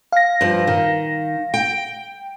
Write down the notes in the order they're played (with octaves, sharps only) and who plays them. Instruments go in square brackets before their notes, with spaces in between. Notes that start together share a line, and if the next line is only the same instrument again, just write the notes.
[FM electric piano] F5 A#6
[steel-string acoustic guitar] G2 F3
D#3
G5